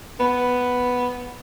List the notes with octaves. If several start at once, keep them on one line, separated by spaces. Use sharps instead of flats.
B3